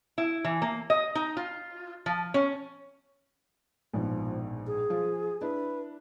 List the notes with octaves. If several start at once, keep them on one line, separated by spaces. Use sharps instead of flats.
E4
E3
A#3
D#5
D#4
F4
F3
C#4
A#1 G#2 B2 F3
G#4
F3 F4
D4 E4 B4